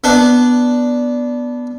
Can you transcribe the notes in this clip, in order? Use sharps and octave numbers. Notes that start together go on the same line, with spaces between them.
B3 D4